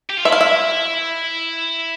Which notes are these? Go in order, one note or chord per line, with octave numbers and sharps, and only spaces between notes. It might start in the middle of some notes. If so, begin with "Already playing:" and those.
G4
F4
E4 E5
F5
E5